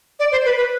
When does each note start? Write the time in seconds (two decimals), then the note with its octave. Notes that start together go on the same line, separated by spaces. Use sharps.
0.20 D5
0.32 C5
0.45 B4
0.57 B4